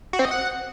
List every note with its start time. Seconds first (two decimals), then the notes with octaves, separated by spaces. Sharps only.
0.13 F#4
0.19 C4
0.25 D#5
0.31 F#5